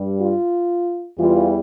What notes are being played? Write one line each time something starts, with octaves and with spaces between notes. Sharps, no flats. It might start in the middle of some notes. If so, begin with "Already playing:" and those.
Already playing: G2 G3
F4
E2 E3 G3 F4